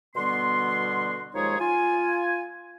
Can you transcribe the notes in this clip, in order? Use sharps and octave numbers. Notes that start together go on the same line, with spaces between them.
B2 D3 G3 B3 F#4 C6
D#2 F3 G#3 D#4 G#4 C#5
F4 G#5